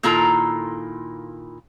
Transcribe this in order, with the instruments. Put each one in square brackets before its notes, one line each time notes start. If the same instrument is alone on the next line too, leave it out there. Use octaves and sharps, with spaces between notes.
[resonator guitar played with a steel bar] A#2 D#3 E4 F4 A4 A#5